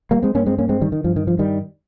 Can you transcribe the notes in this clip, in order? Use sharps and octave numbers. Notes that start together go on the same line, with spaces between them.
G3 A#3
G#3 C4
G2 A#3 C#4
G#3 C4
A#3 C#4
G#3 C4
D#3 G3
D#3
G2 F3
D#3
F3
D#3 G3